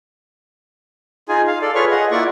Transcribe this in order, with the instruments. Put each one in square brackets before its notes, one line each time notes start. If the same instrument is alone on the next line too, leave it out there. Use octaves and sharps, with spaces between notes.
[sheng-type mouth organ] D#4 F4 G#4 G#5
F5
A4 D5
F4 G#4 B4 C#5 C#6 F6
G#4 D#5 F#5
A#3 E4 F4 D5 F#5 C#6